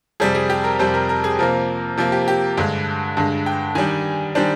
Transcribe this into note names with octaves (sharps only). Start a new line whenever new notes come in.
F2 C3 G3 G#4
G#4
G4
A#4
F2 C3 G3 C5
A#4
A#4
G#4
C3 F3 A#3 A#4
C3 F3 A#3
G4
G4
G2 D3 G#3
G2 D3 G#3
G5
D#3 G3 D4 G#5
D#3 G3 D4 C5